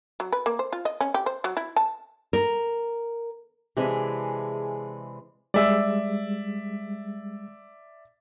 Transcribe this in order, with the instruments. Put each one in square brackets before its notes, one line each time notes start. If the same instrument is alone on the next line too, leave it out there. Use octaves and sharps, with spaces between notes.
[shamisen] F#3
B4
A#3
C5
F4
D#5
C#4
G4
C5
F#3
E4
A5
[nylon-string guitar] A#4
[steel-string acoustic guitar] C3 E3 G#3 D4 G#4
[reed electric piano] G3 G#3 [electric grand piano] D5 E5 E6